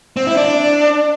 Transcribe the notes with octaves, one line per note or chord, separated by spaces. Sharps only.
C4
E4
D4